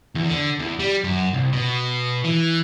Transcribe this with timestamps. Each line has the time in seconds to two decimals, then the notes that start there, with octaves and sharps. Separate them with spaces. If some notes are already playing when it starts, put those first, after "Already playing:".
0.15 E2
0.29 D3
0.59 E2
0.79 G3
1.04 F#2
1.33 C2
1.53 B2
2.24 E3